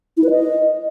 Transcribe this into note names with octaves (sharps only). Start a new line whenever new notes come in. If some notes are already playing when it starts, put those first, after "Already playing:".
E4
B4
D#5